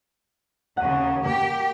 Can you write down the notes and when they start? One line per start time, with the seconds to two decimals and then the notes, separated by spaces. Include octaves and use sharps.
0.77 D#2 C#3 F#5 D#7
1.25 A#3 G4 G5